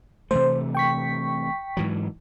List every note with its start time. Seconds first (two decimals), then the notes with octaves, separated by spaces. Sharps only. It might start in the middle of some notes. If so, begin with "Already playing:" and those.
0.31 C3 E3 A3 C5
0.75 G5 C#6 B6
1.77 G#2 E3 F#3